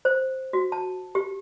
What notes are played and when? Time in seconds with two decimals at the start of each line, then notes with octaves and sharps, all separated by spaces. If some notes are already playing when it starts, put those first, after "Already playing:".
0.05 C5
0.53 F#4
0.72 A5
1.15 G4